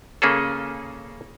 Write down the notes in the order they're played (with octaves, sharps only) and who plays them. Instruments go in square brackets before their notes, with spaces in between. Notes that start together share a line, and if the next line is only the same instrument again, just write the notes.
[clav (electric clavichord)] C#3 A#3 C#4 G#4 A4